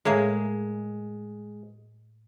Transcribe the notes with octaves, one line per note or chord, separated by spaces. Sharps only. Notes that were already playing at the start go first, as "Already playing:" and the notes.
A2 G#3 A#3 G#4